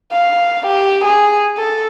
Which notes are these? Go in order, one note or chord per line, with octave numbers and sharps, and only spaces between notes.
F5
G4
G#4
A4